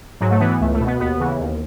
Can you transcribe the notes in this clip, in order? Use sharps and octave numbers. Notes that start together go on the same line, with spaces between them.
G#2 F#3
A3
E3 B3
B3
C#2 A3
A3
B2
B3
D#2 B3
C#3 E3
D#2